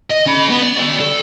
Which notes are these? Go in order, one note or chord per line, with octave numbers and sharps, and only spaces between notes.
D#5
C#4 B5
B3
D5
F#4 D5
A4